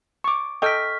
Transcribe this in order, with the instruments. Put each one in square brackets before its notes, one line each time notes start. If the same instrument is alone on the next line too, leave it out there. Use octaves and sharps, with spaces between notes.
[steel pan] C#6 D6
[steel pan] A4 D#5 G5 [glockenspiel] C#6 F6 B6